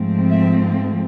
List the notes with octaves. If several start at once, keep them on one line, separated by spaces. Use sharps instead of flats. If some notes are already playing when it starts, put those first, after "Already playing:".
Already playing: G#2 F3 A3 C4
E5